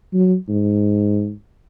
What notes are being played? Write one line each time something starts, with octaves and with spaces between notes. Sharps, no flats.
F#3
G#2